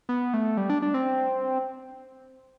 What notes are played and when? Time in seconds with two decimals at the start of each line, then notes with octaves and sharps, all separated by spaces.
0.09 B3
0.34 A3
0.57 G3
0.70 D4
0.82 D4
0.94 C4